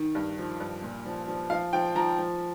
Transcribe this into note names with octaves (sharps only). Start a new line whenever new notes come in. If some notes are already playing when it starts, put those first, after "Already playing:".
Already playing: D#3
G2
F3
G2
A#2
F3
F3
F3 F5
F3 G5
F3 A#5
F3